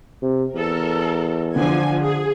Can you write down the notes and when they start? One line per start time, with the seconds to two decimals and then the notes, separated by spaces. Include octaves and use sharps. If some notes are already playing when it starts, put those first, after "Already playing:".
0.22 C3
0.55 E2 A4 A#4
1.56 D3 F3 D4 G#5
2.01 G#4